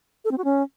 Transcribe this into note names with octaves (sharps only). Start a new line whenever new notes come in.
A4
C4
F#4
C#4